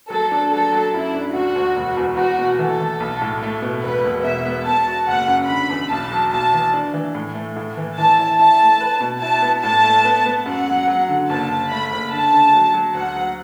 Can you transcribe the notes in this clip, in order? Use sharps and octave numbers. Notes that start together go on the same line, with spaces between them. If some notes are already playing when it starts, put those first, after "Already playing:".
F#3 A4
D4
F#3 A4
F#3
F#2 E4
D4
D2 F#4
D2
E1
E2
E2 F#4
B2
E3 A4
E3
B1
A2
A3
B2
E1 B4
E1
B2 E5
B3
B3 A5
F#4
F#1 F#5
F#2
D3 B5
E2
B1 A5
F#3
B1 A5
E3
D4
E3
A2
A3
A2
E3
E3 A5
E4
E4 A5
A3
B4
B2
E4 A5
B3
A2 A5
A3
B3
B3
F#2 F#5
F#3
F#3
D3
F#1 A5
F#1
A3 B5
F#1
D3 A5
D3
F#3
F#3
D2 F#5
F#3